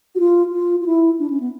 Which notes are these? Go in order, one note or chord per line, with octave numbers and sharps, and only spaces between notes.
F#4
F4
F4
F4
E4
D4
C#4
B3